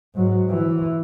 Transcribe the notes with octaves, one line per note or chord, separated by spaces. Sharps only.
G#2 F#3
E3